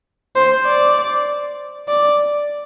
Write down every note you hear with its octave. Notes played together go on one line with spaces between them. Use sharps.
C5
D5
D5